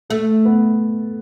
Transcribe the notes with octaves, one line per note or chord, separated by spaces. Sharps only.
A3 A4
B3